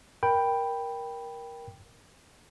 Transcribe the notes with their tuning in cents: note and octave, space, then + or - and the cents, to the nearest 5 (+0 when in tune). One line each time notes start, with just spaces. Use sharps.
A#4 +15 G5 +5 B5 +0